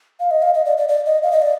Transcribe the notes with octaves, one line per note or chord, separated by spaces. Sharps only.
F5
D#5
F5
D#5
D5
D5
D5
D#5
F5
D#5
D5